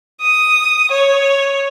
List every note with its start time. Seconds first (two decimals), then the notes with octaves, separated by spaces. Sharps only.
0.21 D#6
0.91 C#5